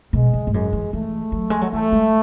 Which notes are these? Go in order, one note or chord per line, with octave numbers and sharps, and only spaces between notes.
B2 G#3
C#3
G#2
F#2 G#3
E3
E3 A3
F#3
G#3
F#3
E3 A3
G#3